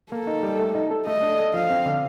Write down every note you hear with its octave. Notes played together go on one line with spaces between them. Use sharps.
A#3 A4
D#4
G3
A3
D#4
A4
A3 D#5
D4
A4
F3 F5
C4
D3